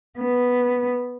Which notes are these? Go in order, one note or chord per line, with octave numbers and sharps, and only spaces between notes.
B3